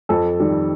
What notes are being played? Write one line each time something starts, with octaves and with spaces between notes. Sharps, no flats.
F2 A4
D#3 G3